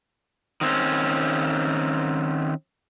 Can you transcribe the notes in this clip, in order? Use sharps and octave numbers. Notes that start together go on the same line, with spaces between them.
D#3 C4 C#4